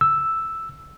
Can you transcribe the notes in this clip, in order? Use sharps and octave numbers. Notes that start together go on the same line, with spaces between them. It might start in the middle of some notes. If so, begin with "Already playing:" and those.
E6